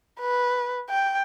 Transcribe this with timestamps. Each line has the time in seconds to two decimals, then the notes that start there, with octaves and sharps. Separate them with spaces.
0.21 B4
0.90 G5